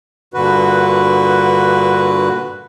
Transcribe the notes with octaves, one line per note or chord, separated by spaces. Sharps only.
G2 A#2 D3 F#4 B4